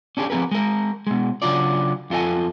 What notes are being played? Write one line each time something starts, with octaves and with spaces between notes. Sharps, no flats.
C#4 D4 G4 G#4
F3 C4 G#4 A#4 B4
G#3 A#4
B2 G#3
C#3 F#3 D4 F4 D5
F2 F4 A4 D#5 G#5